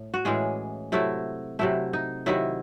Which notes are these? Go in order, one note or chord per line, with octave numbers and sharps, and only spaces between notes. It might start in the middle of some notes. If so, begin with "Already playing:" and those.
Already playing: A2
F#4
A2 E3 G#3 C#4 G#4
C3 F#3 A3 E4
C3 F#3 A3 E4
D#4
C3 D#3 F#3 E4